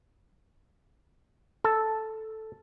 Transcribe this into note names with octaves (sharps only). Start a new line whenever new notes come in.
A4